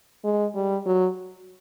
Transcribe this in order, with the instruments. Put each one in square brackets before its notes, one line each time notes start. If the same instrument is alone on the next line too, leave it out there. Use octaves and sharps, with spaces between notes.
[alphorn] G#3
G3
F#3